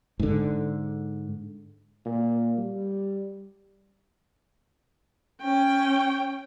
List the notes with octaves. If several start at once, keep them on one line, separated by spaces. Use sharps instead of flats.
G#2 D3
A#2
G3
C#4 G5